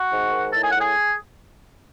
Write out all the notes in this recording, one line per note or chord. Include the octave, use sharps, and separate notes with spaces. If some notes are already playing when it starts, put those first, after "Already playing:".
Already playing: F#4 F#5
G#2
D#3
A2 A5
G#5
A2 F#5
G#4 G#5